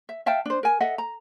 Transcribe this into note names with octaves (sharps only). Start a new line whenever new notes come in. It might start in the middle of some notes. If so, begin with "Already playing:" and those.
E5
E5 F5 G5 A5
D4 C5
A#4 G#5
A4 D#5 E5 F#5
A#5